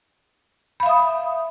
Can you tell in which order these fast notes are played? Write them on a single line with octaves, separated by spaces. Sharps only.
B5 F5 E5 D#6